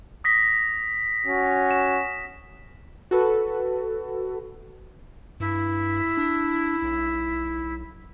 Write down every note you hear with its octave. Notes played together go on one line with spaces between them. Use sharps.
D#6 A#6 B6
C#4 F#4
E7
F#4 A4 B4
G2 E4
D4
B1